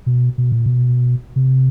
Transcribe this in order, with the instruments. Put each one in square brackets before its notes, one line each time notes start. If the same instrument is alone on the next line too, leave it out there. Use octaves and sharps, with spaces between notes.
[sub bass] B2
B2
A#2
B2
C3